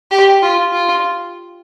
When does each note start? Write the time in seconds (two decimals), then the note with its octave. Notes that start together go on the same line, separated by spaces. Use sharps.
0.11 G4
0.42 F4
0.72 F4